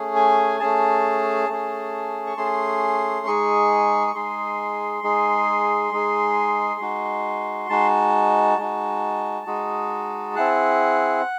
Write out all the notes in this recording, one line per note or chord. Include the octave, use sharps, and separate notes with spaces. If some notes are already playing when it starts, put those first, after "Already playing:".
Already playing: A3 C#4 G#4
G#5
A3 C#4 G#4 A5
A3 C#4 G#4
C#6
A3 C#4 G#4 C6
G#3 D#4 G#4 C#6
C#6
G#3 D#4 G#4 C6
G#3 D#4 G#4
G#3 D#4 G#4
G#3 D#4 F#4
G#3 D#4 F#4 A5
G#3 D#4 F#4
G#3 D#4 F#4
C4 E4 G#4 F#5